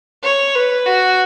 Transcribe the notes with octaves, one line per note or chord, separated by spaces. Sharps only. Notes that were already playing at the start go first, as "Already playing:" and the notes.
C#5
B4
F#4